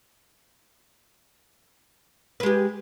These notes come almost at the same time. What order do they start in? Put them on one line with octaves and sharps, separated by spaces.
B4 G#3 G4